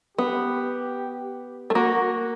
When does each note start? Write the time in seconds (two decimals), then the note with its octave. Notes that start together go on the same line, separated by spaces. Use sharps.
0.17 B3 G4
1.70 A3
1.75 A#3 F#4